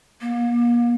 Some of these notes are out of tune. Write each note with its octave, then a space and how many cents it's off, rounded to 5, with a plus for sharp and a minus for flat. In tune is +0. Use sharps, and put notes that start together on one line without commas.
A#3 +35